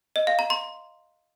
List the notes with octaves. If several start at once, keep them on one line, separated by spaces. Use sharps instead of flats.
D#5
F5
A#5
C6